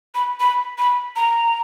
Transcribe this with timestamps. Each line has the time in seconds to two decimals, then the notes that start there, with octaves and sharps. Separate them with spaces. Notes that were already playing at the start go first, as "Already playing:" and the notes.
0.15 B5
0.40 B5
0.78 B5
1.16 A#5